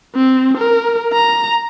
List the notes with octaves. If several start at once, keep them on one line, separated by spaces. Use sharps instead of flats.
C4
A#4
A#5